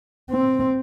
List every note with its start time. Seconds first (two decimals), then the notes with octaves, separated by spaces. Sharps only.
0.31 C4